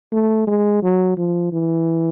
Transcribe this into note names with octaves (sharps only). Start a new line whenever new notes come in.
A3
G#3
F#3
F3
E3